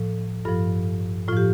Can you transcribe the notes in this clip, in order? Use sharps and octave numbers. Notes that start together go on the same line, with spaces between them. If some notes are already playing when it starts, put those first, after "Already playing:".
Already playing: A2 F3 A4
G2 F3 F4 A4
A2 F3 F4 G4